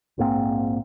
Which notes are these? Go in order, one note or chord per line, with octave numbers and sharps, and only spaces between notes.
A#1 G#2 A#3 C4